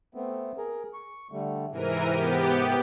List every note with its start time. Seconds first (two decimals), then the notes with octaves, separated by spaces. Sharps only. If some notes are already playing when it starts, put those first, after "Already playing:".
0.15 A3 B3 C4
0.58 G#4 A#4
0.94 C#6
1.32 D3 G3 A3
1.72 G#2 C3 E3 A#4 D#7
2.09 B3 G4